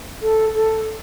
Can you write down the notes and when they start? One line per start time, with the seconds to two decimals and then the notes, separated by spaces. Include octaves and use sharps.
0.22 A4
0.55 A4